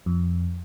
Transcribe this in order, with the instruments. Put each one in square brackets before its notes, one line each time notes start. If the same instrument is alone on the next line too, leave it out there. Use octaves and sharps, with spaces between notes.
[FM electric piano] F2